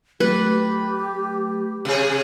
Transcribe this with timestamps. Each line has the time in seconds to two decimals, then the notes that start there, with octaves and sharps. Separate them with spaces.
0.20 F#3 A3 G4 B4
1.85 C3 G#4